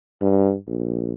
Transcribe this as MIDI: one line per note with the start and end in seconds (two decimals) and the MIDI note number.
0.22 0.55 43
0.67 1.13 34